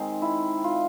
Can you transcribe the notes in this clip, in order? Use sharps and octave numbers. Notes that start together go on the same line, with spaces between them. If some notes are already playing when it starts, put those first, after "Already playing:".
Already playing: D#3 G#3 C4
E4
F4